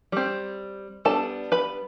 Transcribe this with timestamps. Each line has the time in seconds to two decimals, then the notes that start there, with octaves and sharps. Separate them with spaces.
0.12 G3 C4
1.05 G3 B3 D4 A4 A5
1.52 B4 B5